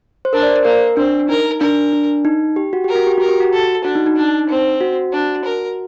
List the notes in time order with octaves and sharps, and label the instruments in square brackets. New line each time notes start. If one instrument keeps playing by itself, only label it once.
[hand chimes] C5
[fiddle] D4 [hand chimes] A#4
[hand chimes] D5
C5
[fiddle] A#3 [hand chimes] A#4
[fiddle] C4 [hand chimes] D4
[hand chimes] D#4 [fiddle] A#4
[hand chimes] D4 [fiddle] A#4
[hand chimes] D4
D#4
G4
F#4
[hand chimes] G4 [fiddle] A#4
[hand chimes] F#4
G4
[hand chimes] F#4 [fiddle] A#4
[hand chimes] G4
F#4
[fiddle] A4
[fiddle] D4 [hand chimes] F#4
[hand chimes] D#4
D#4
[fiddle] D4
C4
[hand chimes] F#4
[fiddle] D4
A#4